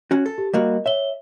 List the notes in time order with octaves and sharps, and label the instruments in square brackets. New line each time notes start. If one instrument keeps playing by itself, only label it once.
[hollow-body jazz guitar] C#4 F#4
A4
[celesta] G4
[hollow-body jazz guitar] G3 A#3 F#4 [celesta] A#4 D#5
[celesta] C#5 G7 [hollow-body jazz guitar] E5